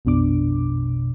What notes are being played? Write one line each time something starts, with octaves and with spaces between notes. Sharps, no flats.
A#1 F2 B2 D4 D6